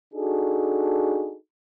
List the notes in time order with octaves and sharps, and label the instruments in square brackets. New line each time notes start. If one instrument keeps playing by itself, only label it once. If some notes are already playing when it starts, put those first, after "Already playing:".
[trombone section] D4 D#4 F#4 G#4 A4